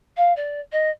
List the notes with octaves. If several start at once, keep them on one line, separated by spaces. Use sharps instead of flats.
F5
D5
D#5